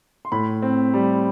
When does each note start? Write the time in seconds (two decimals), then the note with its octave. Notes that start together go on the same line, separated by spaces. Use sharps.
0.25 C6
0.32 A2 B5
0.62 C4
0.94 G3